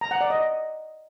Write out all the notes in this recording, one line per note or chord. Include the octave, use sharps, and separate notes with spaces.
A#5
F#5
D5
D#5